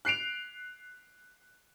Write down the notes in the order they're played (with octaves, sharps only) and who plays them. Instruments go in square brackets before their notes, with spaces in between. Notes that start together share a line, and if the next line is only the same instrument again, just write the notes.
[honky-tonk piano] F#6 C7 D7 F7